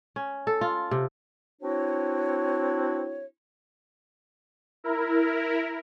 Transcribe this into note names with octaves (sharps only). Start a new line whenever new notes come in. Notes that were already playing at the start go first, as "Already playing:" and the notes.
C#4
A4
F4
C3
C4 D4 E4 F#4 C#5
E4 A#4